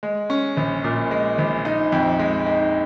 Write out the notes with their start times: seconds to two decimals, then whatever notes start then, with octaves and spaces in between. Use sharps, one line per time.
0.03 G#3
0.30 C#4
0.57 A#1
0.84 A#2
1.11 G#3
1.38 A#1
1.65 D#4
1.92 F2
2.19 G#3
2.46 D#4